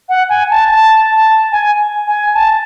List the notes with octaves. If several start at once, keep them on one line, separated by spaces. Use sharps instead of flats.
F#5
G#5
A5
A5
A5
G#5
G#5
A5